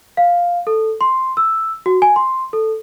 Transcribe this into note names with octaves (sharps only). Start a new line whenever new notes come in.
F5
A4
C6
E6
F#4
G#5
C6
A4